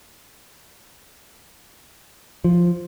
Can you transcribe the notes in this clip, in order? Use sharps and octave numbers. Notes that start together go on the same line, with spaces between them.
F3